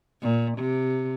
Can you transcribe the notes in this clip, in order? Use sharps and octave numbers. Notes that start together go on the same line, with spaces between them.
A#2
C3